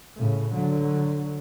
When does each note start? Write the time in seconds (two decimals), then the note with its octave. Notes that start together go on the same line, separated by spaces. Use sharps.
0.16 A2 C#3
0.53 D3 F#3